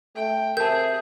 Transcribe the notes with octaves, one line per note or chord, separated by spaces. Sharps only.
A3 G5
C3 G#4 A#4 E5 A5 G6